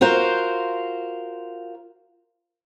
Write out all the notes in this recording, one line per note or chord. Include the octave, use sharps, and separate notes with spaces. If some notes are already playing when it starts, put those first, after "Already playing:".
F4 F#4 A#4 C5 F5